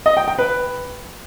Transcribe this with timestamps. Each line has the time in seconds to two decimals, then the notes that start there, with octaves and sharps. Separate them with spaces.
0.06 D#5
0.17 G5
0.28 G5
0.39 B4